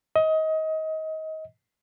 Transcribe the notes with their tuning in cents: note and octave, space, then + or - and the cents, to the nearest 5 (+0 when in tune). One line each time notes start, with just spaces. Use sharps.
D#5 +25